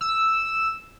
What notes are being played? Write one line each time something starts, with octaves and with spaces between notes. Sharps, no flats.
E6